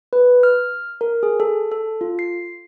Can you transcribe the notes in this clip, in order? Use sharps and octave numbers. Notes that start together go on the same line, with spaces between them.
B4
F6
A#4
G#4
A4
A4
F4
C7